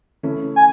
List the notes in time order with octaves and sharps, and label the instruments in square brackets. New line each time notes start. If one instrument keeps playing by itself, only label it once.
[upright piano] C#3 E3 A3 C#4 E4
[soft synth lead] G#5